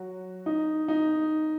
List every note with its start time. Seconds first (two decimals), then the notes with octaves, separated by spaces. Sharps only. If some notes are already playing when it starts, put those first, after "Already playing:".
Already playing: F#3 F#4
0.46 D#4
0.88 D#4